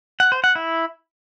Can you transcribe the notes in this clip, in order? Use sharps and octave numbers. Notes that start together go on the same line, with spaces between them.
F#5
C5
F#5
E4